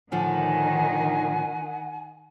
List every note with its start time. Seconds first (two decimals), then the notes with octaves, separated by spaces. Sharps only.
0.12 A2 D3 D#3 F3 F#5 G#5